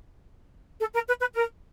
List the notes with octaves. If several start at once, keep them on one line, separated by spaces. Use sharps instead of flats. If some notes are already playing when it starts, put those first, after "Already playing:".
A4
A#4
B4
B4
A#4